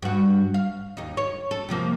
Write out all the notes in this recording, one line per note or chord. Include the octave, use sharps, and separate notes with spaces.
G2 F#4
F5
D#2 D#4
C#5
A4
C3 F3 A#3